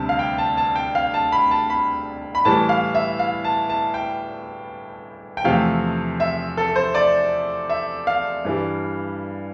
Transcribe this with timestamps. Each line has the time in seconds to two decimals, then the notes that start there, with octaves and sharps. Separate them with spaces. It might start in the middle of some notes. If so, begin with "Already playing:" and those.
Already playing: D2 C3 G3 A5
0.09 F5
0.19 G5
0.38 A5
0.57 A5
0.76 G5
0.95 F5
1.14 A5
1.32 B5
1.51 A5
1.70 B5
2.35 B5
2.45 A2 E3 G3 A5
2.69 F5
2.95 E5
3.19 F5
3.44 A5
3.69 A5
3.94 G5
5.37 G5
5.44 E2 C3 F3 A3 F5
6.20 E5
6.57 A4
6.76 C5
6.95 D5
7.70 E5
8.07 F5
8.45 G2 E3 G3